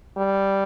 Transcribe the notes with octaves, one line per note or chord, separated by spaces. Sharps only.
G3